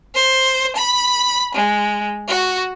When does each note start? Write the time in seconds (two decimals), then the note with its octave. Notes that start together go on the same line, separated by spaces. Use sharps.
0.15 C5
0.75 B5
1.54 G#3
2.28 F#4